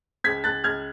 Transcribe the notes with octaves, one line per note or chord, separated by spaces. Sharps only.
C#2 G#6 B6
C#2 F#6 A6
C#2 F6 G#6